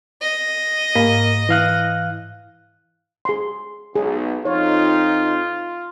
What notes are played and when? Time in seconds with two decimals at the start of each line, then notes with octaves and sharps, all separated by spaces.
0.21 D#5
0.95 G#2 A#3
1.49 E3 F5 F#6
3.25 G#4 C6
3.95 B1 G#4
4.45 F2 D#4 F4 C#5